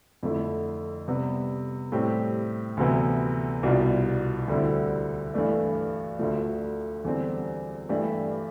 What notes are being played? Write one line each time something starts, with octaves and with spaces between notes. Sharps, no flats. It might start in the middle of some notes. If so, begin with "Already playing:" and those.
F2 D3 A3 E4
C3 G3 B3
A2 G3 C4 G4
D2 C3 E3 B3 E4
C2 B2 G3 D4 F4
D2 D3 G3 C4 E4
G2 E3 A3 D4
D2 D3 F3 A3
E2 D3 G3 C4
G2 E3 A3 D4 G4